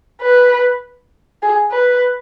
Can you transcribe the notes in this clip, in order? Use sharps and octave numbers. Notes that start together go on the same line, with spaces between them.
B4
G#4
B4